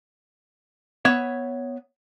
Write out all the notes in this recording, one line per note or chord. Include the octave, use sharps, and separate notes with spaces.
B3 C#5 E5